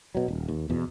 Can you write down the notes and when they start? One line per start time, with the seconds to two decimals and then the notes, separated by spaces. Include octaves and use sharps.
0.15 B2 F#3
0.28 D#1
0.48 D#2
0.70 E2 B2